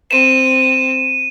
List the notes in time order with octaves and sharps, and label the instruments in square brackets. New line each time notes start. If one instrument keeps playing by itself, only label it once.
[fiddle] C4 [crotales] D#7 E7